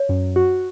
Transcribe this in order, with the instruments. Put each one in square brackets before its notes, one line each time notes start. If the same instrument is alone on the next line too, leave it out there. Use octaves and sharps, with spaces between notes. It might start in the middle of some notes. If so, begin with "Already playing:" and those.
Already playing: [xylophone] C#5
[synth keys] F#2
F#4